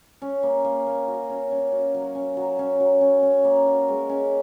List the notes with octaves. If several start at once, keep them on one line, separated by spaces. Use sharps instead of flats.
C#4
A#3
A#3
A#3
F#4
C#4
C#4
F#4
F#3
C#4
F#3
C#4
F#3
C#4
C#4
A#3
F#4
G#3
C#4